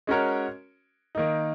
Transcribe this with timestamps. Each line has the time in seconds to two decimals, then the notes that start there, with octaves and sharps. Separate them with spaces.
0.07 G#3 C#4 F#4 A#4 C#5
1.15 D#3 A#3 D#4